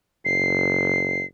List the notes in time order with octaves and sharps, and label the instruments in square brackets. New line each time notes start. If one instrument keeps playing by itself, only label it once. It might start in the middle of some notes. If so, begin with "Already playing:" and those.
[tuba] F#1 [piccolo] C7